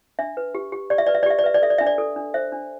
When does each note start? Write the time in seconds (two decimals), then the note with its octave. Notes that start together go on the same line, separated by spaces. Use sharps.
0.19 D4 E5
0.37 B4
0.55 G4
0.72 G4
0.90 G4 D5
0.98 E5
1.07 B4 D5
1.15 E5
1.23 D5
1.26 G4 E5
1.39 D5
1.44 B4 E5
1.54 D5
1.62 A4 E5
1.70 D5
1.78 D4 E5
1.87 D5
1.98 A4
2.16 D4
2.34 C5 E5
2.52 D4